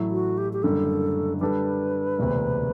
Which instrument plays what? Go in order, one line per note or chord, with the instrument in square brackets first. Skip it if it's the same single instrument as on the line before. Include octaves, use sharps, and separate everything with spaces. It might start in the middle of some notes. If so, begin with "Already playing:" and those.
Already playing: [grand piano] A1 A2 F#3 A3 E4
[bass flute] F#4
G4
G4
[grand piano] F#1 F#2 D3 G3 [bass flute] A4
[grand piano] D3 G3 D4 A4 [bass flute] B4
[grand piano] E1 D2 C3